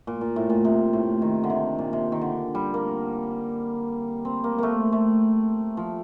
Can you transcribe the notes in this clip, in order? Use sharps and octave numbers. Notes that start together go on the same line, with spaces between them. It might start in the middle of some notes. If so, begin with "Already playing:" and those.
A#2
A#2
A2
A#2
C3
A2
D#3
D3
C3
A#2
C3
D#3
D3
G3
A#3
C4
A#3
A3 A#3
A3
F3